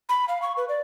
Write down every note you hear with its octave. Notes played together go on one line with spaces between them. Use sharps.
B5
F5
C#6
B4
D5